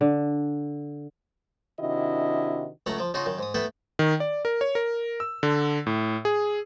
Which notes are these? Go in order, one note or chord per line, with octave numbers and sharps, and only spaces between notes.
D3
C3 D#3 D4 E4 F#4 D#5
C#2 F#3 A3 F#5 A#5
F3 D6
C#3 D#4 F4 F#4
F#2 D#3
G#2 D#6
A3 B3 E4 A4 B4 G5
D#3
D5
A#4
C#5
A#4
E6
D3
A2
G#4